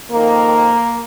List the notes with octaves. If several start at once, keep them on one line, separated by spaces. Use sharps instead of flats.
F2 D#3 A#3